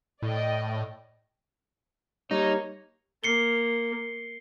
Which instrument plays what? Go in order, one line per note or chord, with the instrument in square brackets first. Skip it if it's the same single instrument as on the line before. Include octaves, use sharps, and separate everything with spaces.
[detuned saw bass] A2 [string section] D5 D#5 G5
[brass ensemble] G3 A#3 C#5 [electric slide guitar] D#4
[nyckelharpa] A#3 [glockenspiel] C7 C#7 G7